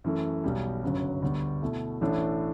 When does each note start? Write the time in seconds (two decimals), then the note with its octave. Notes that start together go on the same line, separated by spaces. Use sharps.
0.04 F#2 E3 A3
0.44 B1 B2 G3
0.83 G1 F#2 C#3 F#3
1.22 D2 D3 G3 B3
1.62 B2 A3 E4
2.01 A1 A2 E3 A3 D4